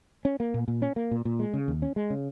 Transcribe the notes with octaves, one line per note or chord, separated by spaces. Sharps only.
C#4
A#3
A#2
A#2
C#4
A#3
A#2
A#2
G#3
C#3
D#2
C#4
G#3
C#3